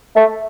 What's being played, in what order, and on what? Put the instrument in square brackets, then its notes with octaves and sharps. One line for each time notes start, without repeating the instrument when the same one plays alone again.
[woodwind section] A3